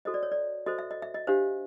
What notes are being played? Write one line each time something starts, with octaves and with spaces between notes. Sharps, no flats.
F#4 A4 C5 D#5
D5
C#5
D5
F#4 A4 C5 D#5
E5
D#5
E5
D#5
D4 G4 C5 F5